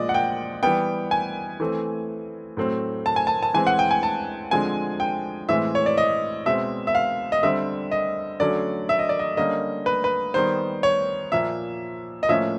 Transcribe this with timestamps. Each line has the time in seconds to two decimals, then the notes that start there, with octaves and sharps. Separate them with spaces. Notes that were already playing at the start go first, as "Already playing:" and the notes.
Already playing: A#2 F3 G#3 D5 D#5
0.09 F#5
0.14 G5
0.63 E3 G3 B3 G5
1.11 G#5
1.60 E3 A3 C4
2.57 A2 F#3 A3 C4
3.06 A5
3.16 G#5
3.27 A5
3.43 A5
3.54 E3 G#3 C4 G#5
3.67 F#5
3.79 G5
3.91 G#5
4.03 A5
4.51 D3 F3 G#3 C4 G#5
5.00 G5
5.49 A2 E3 G#3 C4 E5
5.75 C#5
5.86 D5
5.97 D#5
6.46 B2 G#3 C4 E5
6.87 E5
6.95 F5
7.32 D#5
7.43 D3 G3 C4 E5
7.91 D#5
8.40 D3 F#3 A3 C#4 D5
8.89 E5
8.99 D#5
9.09 D5
9.19 D#5
9.37 D3 G3 A#3 C#4 D#5
9.86 B4
10.04 B4
10.34 D#3 G3 B3 C5
10.83 C#5
11.32 A#2 F3 A#3 E5
12.23 D#5
12.29 A2 F3 A#3 C#4 E5